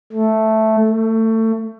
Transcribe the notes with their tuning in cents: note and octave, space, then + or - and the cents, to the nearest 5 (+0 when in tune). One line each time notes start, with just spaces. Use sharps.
A3 -5
A3 +25